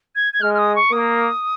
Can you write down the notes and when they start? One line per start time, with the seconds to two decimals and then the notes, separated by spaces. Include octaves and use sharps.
0.15 G#6
0.33 G#6
0.41 G#3 F6
0.54 F6
0.58 D#6
0.75 C#6
0.92 A#3 D#6